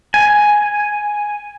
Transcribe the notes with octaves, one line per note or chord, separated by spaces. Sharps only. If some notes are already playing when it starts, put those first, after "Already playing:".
G#5